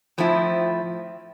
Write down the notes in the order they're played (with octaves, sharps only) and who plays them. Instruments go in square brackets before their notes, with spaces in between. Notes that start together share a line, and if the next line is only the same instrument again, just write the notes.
[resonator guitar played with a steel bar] A2 F3 C4 E4